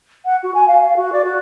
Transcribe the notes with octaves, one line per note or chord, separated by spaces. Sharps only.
F#5
F#4
G#5
F5
F5
F#4
D5
F#4